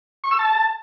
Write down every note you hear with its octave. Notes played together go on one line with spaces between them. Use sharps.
C#6
E6
A5